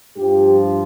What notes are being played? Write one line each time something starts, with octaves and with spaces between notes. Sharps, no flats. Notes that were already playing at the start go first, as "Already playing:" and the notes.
G2 F3 G4